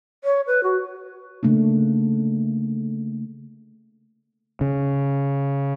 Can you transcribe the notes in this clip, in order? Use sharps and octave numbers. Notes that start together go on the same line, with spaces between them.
C#5
B4
F#4
C#3 A3 A#3 D4
C#3